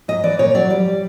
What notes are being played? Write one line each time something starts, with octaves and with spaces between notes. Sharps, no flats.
G#2 D#5
E3 D5
A#2 C#5
F#3 D5
G3 D5
G3